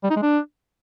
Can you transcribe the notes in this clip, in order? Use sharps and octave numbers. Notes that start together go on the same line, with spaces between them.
G3
D#4
G#3
D4